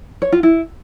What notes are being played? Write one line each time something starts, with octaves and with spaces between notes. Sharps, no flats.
C#5
F4
E4